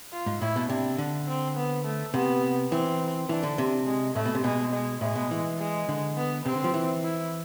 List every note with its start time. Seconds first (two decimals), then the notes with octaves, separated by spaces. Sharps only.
0.12 F4
0.26 G#2
0.41 A2 E4
0.56 B2
0.70 C3 D4
0.98 D3
1.28 C4
1.56 B3
1.85 A3
2.14 C3 B3
2.71 E3 C4
3.29 E3 D4
3.43 D3
3.58 C3
3.87 G#3
4.15 A2 A3
4.25 B2
4.35 C3
4.44 B2 G#3
4.73 G#3
5.01 A2 G#3
5.15 B2
5.31 E3
5.59 G#3
5.89 D3
6.17 B3
6.46 C3 C4
6.55 D3
6.64 F3
6.74 E3
7.04 E4